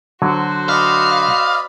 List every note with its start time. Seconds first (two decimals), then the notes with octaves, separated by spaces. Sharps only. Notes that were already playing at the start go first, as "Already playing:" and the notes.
0.22 D3 F#3 F#4 C5
0.69 D5 D#5 F5 B5